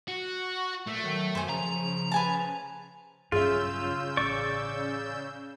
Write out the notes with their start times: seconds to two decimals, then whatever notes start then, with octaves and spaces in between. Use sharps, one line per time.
0.08 F#4
0.87 A#2 A3
1.04 D#3 F#3
1.35 F#2 C5 G#5
1.49 C#3 F3 A#5
2.12 B4 G#5 A5
3.32 B1 G2 C#3 F4 G#4 E5 E6 G6
4.17 A1 D5 C#6